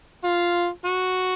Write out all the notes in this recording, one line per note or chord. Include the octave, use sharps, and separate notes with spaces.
F4
F#4